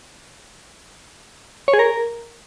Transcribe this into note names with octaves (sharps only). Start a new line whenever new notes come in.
C#5
G#4
A#4